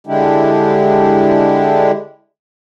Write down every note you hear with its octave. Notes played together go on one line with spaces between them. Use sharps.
D3 G#3 D4 E4 G4